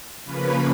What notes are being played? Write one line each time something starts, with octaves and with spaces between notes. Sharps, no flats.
C#3 F3 A#3 C#4 B4 B5